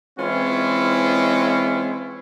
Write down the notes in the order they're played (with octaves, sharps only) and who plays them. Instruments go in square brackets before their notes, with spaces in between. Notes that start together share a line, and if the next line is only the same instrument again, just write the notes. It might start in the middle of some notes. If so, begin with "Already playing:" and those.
[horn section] E3 G#3 C4 C#4 E4 F4